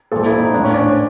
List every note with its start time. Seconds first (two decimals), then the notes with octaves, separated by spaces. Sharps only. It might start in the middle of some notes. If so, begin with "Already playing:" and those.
0.12 A#2 F3 A4
0.26 E4
0.39 D#4
0.53 A2 F3 D4
0.64 C#4
0.74 D4
0.84 C#4